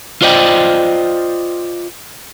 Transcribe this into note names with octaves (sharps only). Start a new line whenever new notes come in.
F4 C5 D5 D#5 G5